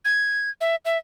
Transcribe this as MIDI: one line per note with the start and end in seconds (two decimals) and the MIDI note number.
0.05 0.50 92
0.61 0.76 76
0.85 0.98 76